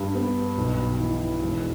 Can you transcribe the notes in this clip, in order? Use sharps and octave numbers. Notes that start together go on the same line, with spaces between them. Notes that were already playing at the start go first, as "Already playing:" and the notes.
Already playing: G2
B3
B1
E3
E1